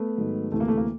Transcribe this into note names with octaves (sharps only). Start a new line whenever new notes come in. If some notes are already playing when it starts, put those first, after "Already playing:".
Already playing: A3 B3
G#2 D#3 F#3
D2 C3 E3 A3
A#3
A3
A#3